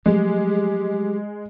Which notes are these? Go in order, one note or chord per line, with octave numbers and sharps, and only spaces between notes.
F3 F#3 G#3 A3 G4